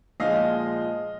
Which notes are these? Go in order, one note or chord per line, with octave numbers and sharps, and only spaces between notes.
A#2 F3 G#3 D#5 F5